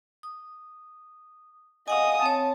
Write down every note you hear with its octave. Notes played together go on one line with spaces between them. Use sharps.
D#6
D#5 F5 F#5 G#5 D#6
C4 C#5 A5